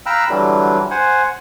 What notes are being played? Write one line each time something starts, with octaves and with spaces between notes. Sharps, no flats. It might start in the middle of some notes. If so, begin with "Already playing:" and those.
F5 G5 A#5 B5 E6 F#6
D3 E3 F#3 G3
C5 F#5 G#5